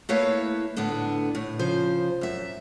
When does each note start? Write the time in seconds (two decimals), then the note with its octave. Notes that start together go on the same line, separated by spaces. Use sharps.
0.09 A3 A#3 E4 B4 C#5 F5
0.77 A2 D3 B3 D4
1.35 A2
1.59 C#3 F3 C5
2.21 F#2 E5